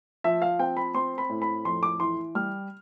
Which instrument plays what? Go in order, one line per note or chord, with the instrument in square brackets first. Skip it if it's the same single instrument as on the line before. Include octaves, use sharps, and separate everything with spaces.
[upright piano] F3 E5
F5
C4 G5
B5
C4 C6
B5
A2
B5
F2 C6
D6
E3 C6
G3 F6